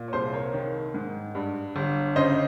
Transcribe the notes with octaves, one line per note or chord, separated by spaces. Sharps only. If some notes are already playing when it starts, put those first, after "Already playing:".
Already playing: A#2
C#5
C2 G#4 C5
A#4 C#5
D#3
G#2
G2
G1
C#3 C5 D#5